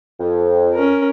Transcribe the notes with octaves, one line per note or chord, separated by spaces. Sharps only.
F2
C#4 A#4